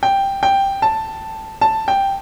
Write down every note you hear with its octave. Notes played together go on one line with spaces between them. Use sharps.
G5
G5
A5
A5
G5